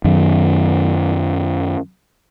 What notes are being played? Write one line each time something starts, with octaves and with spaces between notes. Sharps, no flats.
F#2 D#3